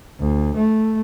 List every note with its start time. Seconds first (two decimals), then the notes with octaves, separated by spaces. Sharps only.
0.20 D2
0.56 A3